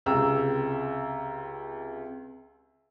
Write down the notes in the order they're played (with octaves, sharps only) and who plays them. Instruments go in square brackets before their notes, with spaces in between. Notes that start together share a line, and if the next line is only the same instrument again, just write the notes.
[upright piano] C#2 C3 A#5 E6